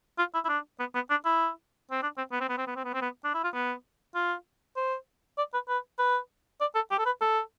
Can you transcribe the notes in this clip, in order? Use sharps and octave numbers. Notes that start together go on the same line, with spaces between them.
F4
E4
E4
D4
B3
B3
D4
E4
C4
D4
C4
B3
C4
B3
C4
B3
C4
B3
C4
B3
D4
E4
F4
B3
F4
C5
D5
B4
B4
B4
D5
A4
G4
A4
B4
A4